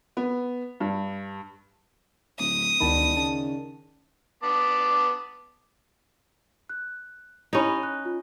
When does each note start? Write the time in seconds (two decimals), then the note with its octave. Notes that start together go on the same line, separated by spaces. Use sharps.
0.17 B3
0.80 G2
2.39 D1 D#6
2.80 E1 D2 D#3 D4 A5 B5
3.16 C#3 A5
4.43 B3 A5 D6
6.69 F#6
7.53 C#4 D#4 E4 G4 B5
7.83 F#6
8.05 F4